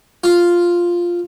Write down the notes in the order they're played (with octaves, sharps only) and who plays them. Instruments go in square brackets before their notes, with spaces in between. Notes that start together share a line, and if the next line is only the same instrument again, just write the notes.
[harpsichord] F4